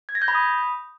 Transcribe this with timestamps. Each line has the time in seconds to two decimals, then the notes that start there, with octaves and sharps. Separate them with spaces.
0.09 G#6
0.15 A#6
0.22 G6
0.28 B5
0.35 D#6